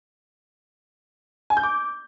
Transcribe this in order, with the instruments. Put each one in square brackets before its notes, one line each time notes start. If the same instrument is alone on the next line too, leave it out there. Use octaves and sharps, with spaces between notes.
[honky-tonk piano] G#5
G6
D6